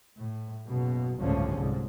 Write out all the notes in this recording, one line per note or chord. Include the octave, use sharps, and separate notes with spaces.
A2
F#1 B2
G1 C#2 A2 D3 F3 C#4
C2 G#2